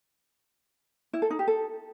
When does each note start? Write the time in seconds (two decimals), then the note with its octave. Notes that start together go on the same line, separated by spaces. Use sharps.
1.13 E4
1.22 A4
1.31 D#4
1.39 G4
1.48 A4